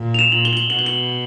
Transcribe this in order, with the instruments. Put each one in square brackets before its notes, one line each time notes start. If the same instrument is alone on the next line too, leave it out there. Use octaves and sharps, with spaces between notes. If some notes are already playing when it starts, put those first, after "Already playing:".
Already playing: [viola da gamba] A#2
[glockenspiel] F7
E7
[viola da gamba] A#2 [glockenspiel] F#7
[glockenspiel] G7
F#7
G7
[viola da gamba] B2 [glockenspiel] F#7
[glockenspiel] G7
F#7